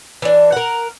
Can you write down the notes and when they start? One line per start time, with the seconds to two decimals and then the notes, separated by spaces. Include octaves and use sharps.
0.22 E3 D4
0.52 A#4 F#5